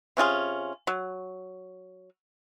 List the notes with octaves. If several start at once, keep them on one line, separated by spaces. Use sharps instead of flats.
C3 C#4 F4 G#4
F#3